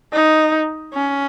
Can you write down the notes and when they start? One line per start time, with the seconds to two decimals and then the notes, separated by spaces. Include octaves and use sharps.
0.13 D#4
0.94 C#4